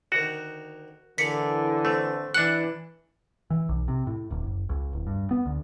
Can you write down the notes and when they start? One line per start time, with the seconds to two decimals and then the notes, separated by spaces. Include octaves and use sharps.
0.12 D2 D#3 F#4
1.18 A2 D3 E3 A#3 G4 G#4 B6 C#7
1.85 A3 C4
2.34 E3 D4 A4 F#5 F#6
3.50 E3
3.69 B1
3.88 C3
4.07 A2
4.31 D1
4.43 F#1
4.69 C#2
4.93 D1
5.07 G2
5.31 B3
5.46 D2